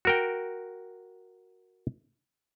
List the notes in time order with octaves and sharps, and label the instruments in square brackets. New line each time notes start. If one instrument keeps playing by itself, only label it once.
[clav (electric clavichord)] F#4 A#4 G5